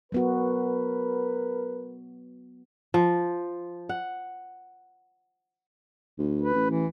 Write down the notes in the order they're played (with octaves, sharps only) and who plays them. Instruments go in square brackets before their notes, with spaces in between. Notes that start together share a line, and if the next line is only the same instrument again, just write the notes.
[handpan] F#3 B3 F#4 [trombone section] A#4 B4
[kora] F3
F#5
[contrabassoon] D2
[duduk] B4
[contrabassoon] A1
[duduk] E3